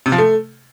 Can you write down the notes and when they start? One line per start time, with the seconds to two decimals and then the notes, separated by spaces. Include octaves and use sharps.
0.06 C3
0.12 F3
0.18 A3